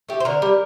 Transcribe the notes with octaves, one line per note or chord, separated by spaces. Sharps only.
A3 G4
C5
D3 A#4
G3